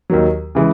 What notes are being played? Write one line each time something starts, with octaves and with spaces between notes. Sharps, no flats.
D#2 D#3 F#3
C#3 E3 G#3